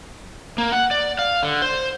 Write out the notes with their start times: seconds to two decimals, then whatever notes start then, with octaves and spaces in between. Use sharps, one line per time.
0.58 A#3
0.72 F#5
0.91 D5
1.19 F5
1.43 D3
1.62 C5